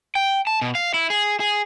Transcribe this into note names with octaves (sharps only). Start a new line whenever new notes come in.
G5
A5
B2
F5
E4
G#4
G#4